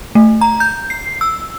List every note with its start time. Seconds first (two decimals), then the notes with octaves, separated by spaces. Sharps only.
0.15 A3
0.41 A#5
0.60 G6
0.90 C7
1.21 E6